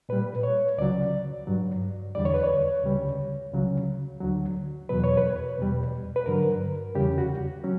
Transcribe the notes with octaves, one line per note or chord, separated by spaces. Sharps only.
A#2 G3 B4
C#5
C#2 C#3 F#3 D5
G2 F#3
E2 D3 G3 D5
C#5
B4
C#5
D2 C#3 G3
C#2 C#3 F#3
D2 D3 F#3
E2 B2 F#3 B4
C#5
B4
E2 B2 G3
B4
G2 D3 F#3 A#4
E2 C#3 G3 G4
F#4
F#3 C#4